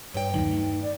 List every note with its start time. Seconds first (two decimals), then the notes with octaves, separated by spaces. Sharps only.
0.14 G2 C#5 G5
0.34 D#2 D#3 F#3 D#4
0.50 A3
0.82 D5